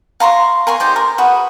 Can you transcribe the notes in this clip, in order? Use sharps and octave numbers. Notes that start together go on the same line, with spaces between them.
F5 A#5 C6 C#6
A#4 G#5 C6 C#6
D#4 G4 C5 D5
A#4
F#4 G#4 B4